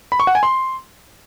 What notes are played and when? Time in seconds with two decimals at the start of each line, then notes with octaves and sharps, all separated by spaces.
0.12 B5
0.20 C#6
0.27 F#5
0.35 G#5
0.43 C6